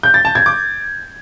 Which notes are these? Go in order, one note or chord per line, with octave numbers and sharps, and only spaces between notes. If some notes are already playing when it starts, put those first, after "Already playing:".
G6
A6
A5
G#6
D6